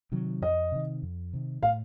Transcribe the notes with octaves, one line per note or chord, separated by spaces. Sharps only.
C3 D#3 F#3
F2 D#5
C3 D#3
F2
C3 D#3
A2 F5